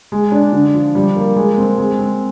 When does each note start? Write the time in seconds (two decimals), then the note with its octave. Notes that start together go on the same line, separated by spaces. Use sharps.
0.12 G#3
0.32 D4
0.53 D3
0.74 F3
0.95 G3
1.16 A#3
1.37 G#3
1.58 C4
1.78 G#3
1.99 C4